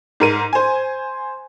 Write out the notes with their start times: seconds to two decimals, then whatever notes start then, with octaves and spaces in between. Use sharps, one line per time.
0.20 G#2 A#4 D#7
0.53 C5 G#5